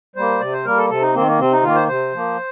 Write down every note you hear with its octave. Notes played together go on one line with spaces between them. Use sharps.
G3 A#3 C5
C3 D5
C5
G3 A#3 A#4
A4
C3 A4
D#4
D#3 A#3 C4
A#3
C3 C4
D#4
D#3 A#3 F4
C5
C3 C5
F3 A#3